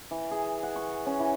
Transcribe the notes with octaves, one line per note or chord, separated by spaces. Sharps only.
E3
G#4
F#5
C#6
C#4
E3